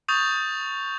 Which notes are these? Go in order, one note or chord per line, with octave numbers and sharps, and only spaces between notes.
C#6 D#6 G6 A6 F7